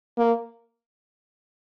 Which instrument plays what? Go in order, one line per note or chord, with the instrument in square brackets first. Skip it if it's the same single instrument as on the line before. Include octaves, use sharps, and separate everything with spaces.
[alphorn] A#3